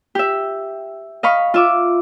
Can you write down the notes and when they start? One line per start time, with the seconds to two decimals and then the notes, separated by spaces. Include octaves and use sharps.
0.15 G4 E5
1.23 D#5 F5 B5 C#6
1.54 F4 E5 D6